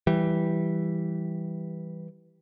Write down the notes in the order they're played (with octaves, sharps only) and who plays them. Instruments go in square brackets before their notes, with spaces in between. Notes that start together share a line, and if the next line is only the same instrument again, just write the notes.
[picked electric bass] E3 G3